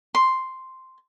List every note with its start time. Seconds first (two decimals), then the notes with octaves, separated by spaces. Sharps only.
0.15 C6